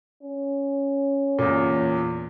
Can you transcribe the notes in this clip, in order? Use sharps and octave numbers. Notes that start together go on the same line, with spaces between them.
C#4
E2 A#2